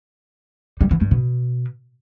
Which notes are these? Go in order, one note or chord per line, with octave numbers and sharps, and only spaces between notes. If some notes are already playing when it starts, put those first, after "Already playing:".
G3
E3
G2
B2